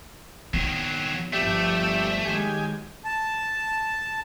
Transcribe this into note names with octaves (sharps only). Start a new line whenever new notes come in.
D#3 F#3 B3
G1 G2 F3 A3 G4 D5 E5
D#3 F#3 G#3 G4 G#5
A5